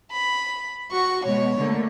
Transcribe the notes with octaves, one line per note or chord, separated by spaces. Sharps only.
B5
F#4 C#6
B2 G#3 C#5
D3 A3 A#3